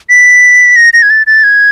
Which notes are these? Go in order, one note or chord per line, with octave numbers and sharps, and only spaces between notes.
B6
A#6
A#6
G#6
A6
A6
G#6